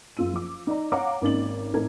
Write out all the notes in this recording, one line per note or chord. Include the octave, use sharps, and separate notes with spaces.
F#1 F4 E6 D#7
F3 D6
D#4 D5 A#5
C#5 F5 F#5 A#5 D6
G#1 A#3 C#4 D#4 A6 F#7
A1 C4 D#4 A4 A#4 G#6